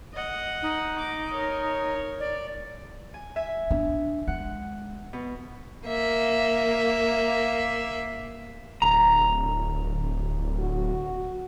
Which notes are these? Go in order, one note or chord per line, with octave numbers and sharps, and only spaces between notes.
D#5 F#5
D#4
D6
A#4 C#5
D5
G#5
E5 G#5
D4
G#3 F#5
B2
A#3 E5
D1 A#5
F#4